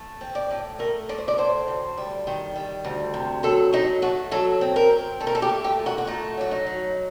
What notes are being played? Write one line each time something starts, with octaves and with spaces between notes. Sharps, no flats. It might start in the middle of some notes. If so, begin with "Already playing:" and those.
Already playing: A3
C4
D5
A2
A3 A#4
A3 D5
C5
D5
A2 C5
D2
G3
D#3
G3
D2
C3
F#3 A4
F#3 D#4
A3 F#4
F#3 A4
C4
A#4
C4
A3 A4
A#4
A4
G4
A3
G4
A#2
F#4
F#4
A3 D#4
F#3 F#4
D#4
F#3